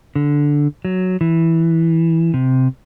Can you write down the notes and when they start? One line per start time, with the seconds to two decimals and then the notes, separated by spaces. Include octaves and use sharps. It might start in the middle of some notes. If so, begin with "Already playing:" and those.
0.15 D3
0.85 F#3
1.21 E3
2.34 C3